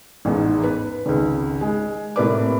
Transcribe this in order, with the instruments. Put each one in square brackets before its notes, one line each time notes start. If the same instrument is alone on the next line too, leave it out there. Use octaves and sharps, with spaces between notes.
[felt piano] A1 E2 G#2
B4
G#1 C#2
G#3
A2 C3 A#3 B4 D5 D6